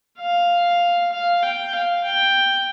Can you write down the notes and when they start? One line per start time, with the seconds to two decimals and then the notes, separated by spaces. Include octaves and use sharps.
0.19 F5
1.12 F5
1.42 G5
1.73 F5
2.04 G5